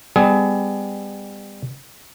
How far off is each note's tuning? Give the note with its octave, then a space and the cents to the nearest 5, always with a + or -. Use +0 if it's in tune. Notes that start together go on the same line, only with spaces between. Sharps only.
G3 +35 B3 +40 G#4 +30